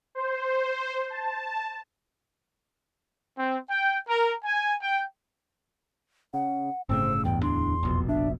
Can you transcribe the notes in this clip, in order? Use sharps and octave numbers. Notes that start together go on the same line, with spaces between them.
C5
A5
C4
G5
A#4
G#5
G5
C#3 F#5
G1 A2 C#3 C4 E6
A1 E2 G2 G5
D1 A2 D4 C6
F1 A#1 B2
D4 E5